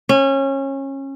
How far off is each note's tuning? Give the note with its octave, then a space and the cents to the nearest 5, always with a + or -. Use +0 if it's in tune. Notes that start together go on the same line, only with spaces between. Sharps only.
C#4 -25